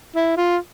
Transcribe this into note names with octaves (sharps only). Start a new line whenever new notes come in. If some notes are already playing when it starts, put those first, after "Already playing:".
E4
F4